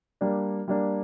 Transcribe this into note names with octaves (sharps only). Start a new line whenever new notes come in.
G3 A#3 D4
G3 A#3 D4